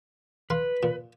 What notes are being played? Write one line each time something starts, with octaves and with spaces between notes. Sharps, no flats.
B4 F5 C6
A#2